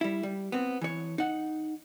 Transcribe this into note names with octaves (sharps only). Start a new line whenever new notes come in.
G3 E4
G3
B3 C4
E3 C#5
D#4 F#5